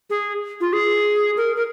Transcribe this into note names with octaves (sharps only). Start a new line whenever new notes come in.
G#4
F4
G#4
A#4
A#4